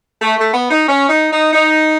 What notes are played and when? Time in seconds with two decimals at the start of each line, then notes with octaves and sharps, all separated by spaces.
0.22 A3
0.38 A3
0.54 B3
0.71 D#4
0.87 C#4
1.09 D#4
1.31 D#4
1.53 D#4